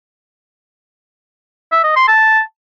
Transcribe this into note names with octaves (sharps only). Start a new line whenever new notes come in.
E5
D#5
C6
A5